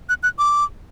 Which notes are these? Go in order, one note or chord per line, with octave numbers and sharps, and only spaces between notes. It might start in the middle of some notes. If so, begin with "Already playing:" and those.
F#6
F#6
D6